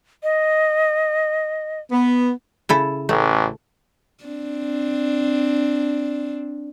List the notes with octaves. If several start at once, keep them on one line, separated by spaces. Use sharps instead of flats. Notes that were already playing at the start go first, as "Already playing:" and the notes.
D#5
B3
C#3 E4 A4
A1 A3
C4 D4